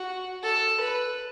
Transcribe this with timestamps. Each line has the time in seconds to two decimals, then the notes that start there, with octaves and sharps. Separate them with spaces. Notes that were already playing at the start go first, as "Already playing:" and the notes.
Already playing: F#4
0.43 A4
0.80 B4